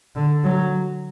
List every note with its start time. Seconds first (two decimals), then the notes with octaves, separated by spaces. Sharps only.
0.15 D3
0.44 F#3